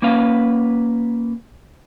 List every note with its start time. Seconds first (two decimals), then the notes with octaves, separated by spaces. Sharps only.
0.02 A#3 C#4 B4 F5